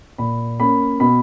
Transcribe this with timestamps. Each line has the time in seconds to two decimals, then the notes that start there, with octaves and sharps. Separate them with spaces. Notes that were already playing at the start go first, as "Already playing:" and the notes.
0.18 A#2 B5
0.60 A#3 C#4 B5
1.00 B2 B5